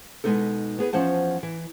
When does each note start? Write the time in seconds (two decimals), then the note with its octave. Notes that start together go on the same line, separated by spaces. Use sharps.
0.24 B2 G3 G#3 B3 D#4 A4
0.79 B3 G#4 B4
0.93 E2 F3 C#4 C5 F#5 A5
1.43 E3